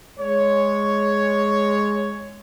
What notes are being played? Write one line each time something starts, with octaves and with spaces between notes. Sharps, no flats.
G#3 C#5